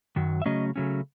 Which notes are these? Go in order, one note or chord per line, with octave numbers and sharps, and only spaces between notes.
F#2 D#3 F#3
E5
C#3 F#3 A3 C#4 D#5
C#3 F#3 A3 C#4